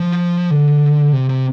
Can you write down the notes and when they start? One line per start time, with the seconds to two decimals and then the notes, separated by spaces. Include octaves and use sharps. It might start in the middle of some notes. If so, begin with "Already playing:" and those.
Already playing: F3
0.51 D3
1.12 C3
1.29 C3